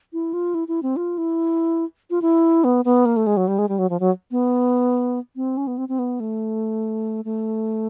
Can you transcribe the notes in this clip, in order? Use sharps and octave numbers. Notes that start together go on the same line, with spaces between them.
E4
F4
E4
E4
C4
F4
E4
F4
E4
B3
B3
A#3
A3
G#3
F#3
G3
G#3
G3
F#3
F3
F#3
B3
C4
C#4
B3
C4
C4
B3
A3
A3